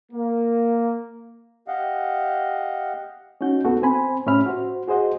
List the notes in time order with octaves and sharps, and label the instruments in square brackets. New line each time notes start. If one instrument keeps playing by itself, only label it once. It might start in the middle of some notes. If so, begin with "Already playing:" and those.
[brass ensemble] A#3
[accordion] G4 D#5 F5 F#5
[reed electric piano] C#4 D#4 F#4 G6
C#2 B3 F#4 A4
C4 C5 G#5 B5
A2 C#4 G4 E5 B5 F6
F#4 C5
F#4 G#4 C5 D#5 F#5